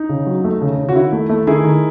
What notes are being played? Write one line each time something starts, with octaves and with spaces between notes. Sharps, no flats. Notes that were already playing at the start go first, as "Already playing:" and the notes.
Already playing: D#4
C#3
F#3
A3
C#3
C#3
F#4
D#3 E4
A3
A3
D#3 E4 G#4
D#3